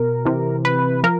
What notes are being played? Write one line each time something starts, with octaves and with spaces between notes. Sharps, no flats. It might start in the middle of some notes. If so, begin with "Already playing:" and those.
Already playing: B2 A#4
C3 E3
B4
F3 A#4